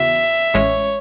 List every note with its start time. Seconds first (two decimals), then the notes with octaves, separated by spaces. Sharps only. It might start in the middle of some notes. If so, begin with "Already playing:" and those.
Already playing: E2 C#3 E3 B3 F#4 E5
0.54 A1 A2 G#3 C#4 C#5